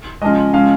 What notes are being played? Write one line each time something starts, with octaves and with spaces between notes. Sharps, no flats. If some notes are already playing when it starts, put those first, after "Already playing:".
C#3 F3 G#3 D#5
C#3 F3 G#3 F5